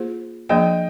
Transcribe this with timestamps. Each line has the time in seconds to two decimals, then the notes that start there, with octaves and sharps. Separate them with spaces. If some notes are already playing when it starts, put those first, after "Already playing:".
Already playing: A#3 F4 G#4 C5
0.49 F3 A#3 D4 G#4 D5 D#5 G5